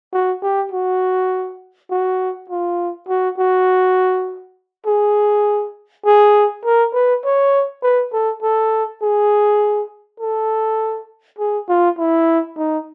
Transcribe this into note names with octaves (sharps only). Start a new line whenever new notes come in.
F#4
G4
F#4
F#4
F4
F#4
F#4
G#4
G#4
A#4
B4
C#5
B4
A4
A4
G#4
A4
G#4
F4
E4
D#4